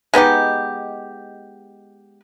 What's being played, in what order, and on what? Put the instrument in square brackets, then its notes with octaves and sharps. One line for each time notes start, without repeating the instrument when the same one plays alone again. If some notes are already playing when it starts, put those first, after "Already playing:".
[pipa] G#3 B3 D#4 G4